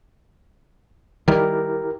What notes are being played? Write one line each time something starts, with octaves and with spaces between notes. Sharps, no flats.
D#3 G3 E4 G4 A#4